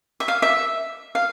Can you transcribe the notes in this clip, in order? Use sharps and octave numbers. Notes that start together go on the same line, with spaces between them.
E5
F5
E5
F5